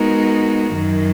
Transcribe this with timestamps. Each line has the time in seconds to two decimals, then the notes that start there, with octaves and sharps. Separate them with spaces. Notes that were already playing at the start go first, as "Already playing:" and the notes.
Already playing: G#3 B3 D#4 F#4 A#4
0.74 F#2 D#3 F#3